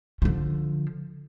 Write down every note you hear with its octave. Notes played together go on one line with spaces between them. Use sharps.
D3 F3